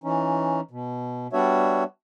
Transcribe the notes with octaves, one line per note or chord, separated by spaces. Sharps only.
E3 C#4 D#4
B2
G3 B3 D4 F#4 C#5 E5